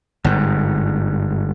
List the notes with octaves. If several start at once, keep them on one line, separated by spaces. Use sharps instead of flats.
G1 G#2